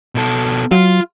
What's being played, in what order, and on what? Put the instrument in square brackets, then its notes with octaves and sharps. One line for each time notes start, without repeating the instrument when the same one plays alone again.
[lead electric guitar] B2 A4
[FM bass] F#3 [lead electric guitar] F4